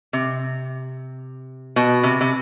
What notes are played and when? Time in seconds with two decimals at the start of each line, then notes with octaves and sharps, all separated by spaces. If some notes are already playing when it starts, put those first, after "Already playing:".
0.13 C3
1.76 B2
2.03 C3
2.21 C3